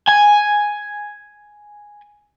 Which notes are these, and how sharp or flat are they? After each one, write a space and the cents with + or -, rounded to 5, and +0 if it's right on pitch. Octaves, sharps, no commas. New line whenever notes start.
G#5 +0